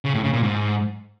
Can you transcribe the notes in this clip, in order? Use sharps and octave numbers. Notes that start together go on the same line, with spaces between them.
C#3
A2
C#3
A#2
G#2